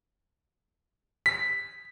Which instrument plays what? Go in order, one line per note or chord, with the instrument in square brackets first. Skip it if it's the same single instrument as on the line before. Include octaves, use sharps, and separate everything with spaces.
[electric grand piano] B6